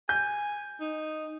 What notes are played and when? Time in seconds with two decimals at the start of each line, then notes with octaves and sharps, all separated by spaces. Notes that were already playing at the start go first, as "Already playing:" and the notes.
0.09 G#5 G6
0.81 D#4